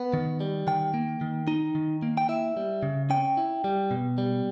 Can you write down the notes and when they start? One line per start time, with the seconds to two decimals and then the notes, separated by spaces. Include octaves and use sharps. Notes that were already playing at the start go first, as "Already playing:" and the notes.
Already playing: B3
0.13 D#3
0.40 G3
0.67 D#3 G5
0.94 A#3
1.21 D#3
1.48 D#4
1.75 D#3
2.02 A#3
2.17 G5
2.29 E4 E5
2.57 G3
2.83 C#3
3.10 C#4 G5
3.37 E4
3.64 G3
3.91 B2
4.18 G3